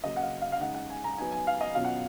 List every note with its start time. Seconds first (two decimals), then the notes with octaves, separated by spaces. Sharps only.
0.03 C#3 F#3 A#3 D#5
0.16 F#5
0.23 F5
0.41 F5
0.52 F5
0.60 C#3 G#3 D#4 F#5
0.75 F#5
0.90 G#5
1.04 A#5
1.18 F#3 B3 D#4 G#5
1.32 G#5
1.47 F5
1.61 D#5
1.75 B2 F#3 C#4 F4 F5
1.85 F#5